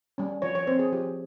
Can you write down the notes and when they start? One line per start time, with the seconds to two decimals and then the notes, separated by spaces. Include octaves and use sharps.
0.18 G3 C#4
0.42 F3 C#5
0.55 C#5
0.67 C4 C5
0.79 G#4
0.92 F3 G4